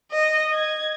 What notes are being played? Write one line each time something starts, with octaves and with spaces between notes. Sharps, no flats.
D#5
G#6